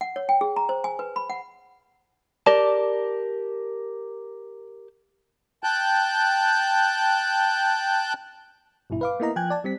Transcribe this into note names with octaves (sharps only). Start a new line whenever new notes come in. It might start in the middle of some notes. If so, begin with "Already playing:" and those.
F#5
C#5
G5
G#4
A#5
C5
G#5
B4
B5
F#5
G4 A#4 D5 A5
G5 A5 F#6 G6
G#1 G2 B2 E4
B4 F5 D6
A#3 B3 E4 D#5 A#5
F3 G5 G#5 F#6 G#6
D5 A5
G3 C4 B6